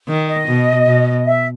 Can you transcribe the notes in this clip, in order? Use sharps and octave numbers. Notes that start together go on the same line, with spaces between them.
D#3
D#5
B2
B2
E5